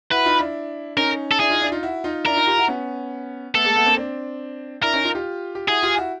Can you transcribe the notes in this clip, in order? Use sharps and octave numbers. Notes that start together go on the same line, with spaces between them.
E4 F#4 B4
D#4 F4
D4 E4
C#4 D#4 A#4
A4
D4 E4 G#4
D#4 F4
D4 E4
D#4 F4
E4 F#4
D#4 F4
D4 E4 A#4
D#4 F4
F4 G4
E4 F#4
B3 C#4
A3 B3 A4
G#3 A#3
A3 B3
A#3 C4
C4 D4
D4 E4 A#4
C#4 D#4
D#4 F4
F4 G4
G4
E4 F#4 G#4
F4 G4
E4 F#4